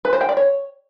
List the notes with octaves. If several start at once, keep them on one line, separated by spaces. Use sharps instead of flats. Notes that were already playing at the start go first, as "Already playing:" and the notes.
B4
C5
G5
D5
C#5